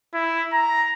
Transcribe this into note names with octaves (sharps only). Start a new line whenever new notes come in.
E4
A#5